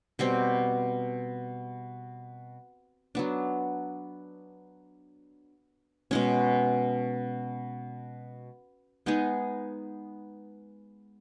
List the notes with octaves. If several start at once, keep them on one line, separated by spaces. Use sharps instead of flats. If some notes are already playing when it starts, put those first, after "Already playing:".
B2 G3 C4
F#3 B3 D4
B2 G#3 C#4
G#3 B3 D#4 G#4